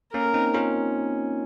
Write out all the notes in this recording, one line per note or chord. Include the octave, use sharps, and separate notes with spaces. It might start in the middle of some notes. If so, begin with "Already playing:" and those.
A#3 C#4 A#4
C4 D#4
C#4 F4